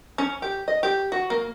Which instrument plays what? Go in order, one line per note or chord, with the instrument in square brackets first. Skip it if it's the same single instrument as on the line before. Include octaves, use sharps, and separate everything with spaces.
[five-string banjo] C#4
G4
D#5
G4
F#4
A#3